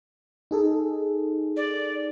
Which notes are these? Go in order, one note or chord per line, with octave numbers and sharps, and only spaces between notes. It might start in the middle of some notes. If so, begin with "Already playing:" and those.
D#4 G#4 A4
D5